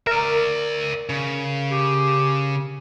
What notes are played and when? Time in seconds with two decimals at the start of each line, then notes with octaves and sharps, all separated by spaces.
0.07 A#4 D5 E5
1.09 C#3
1.71 G4